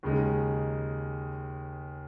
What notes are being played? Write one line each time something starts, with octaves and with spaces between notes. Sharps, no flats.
D#2 C#3 G#3 D#4